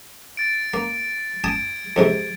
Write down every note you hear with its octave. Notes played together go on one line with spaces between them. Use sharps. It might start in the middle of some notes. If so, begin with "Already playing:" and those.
A6 D7
A#3
G#5 A5 D#6 G#6 D7
F2 G#2 C3